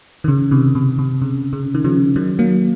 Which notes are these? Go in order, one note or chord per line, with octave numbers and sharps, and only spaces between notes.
D#3
C#3
C3 D#3
C3
C3
C#3
C#3
D#3
C#3 F3
D#3 F#3
F#3 A#3